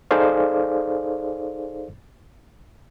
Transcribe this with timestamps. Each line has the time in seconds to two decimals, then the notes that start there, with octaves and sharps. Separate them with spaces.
0.11 D#4 G#4 A4 C5 D5 F5